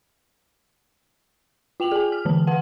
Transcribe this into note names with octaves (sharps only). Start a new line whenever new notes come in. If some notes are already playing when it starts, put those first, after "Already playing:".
F4 G5 F7 F#7
G#4 G#5
F6
D3 E3 A5
B4 F#5 A5